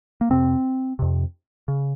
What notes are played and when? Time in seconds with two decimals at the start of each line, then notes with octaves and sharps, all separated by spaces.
0.21 A#3
0.30 F2 C3 C4
0.99 F2 C3
1.68 C#3